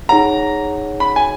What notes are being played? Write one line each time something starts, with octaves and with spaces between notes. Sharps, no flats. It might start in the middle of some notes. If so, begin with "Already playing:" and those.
D#4 G#4 C#5 F#5 A#5
B5
G#5